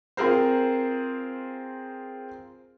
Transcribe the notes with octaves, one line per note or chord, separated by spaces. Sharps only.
C4 F4 G#4 A#4 C5